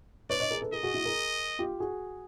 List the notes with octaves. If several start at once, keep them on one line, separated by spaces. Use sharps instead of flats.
B4 C#5 D5
C#5 D#5
G#4 A#4
A4 B4
G#4 A#4 D#5
F#4 G#4
E4 F#4
G#4 A#4
F4 G4
F#4 G#4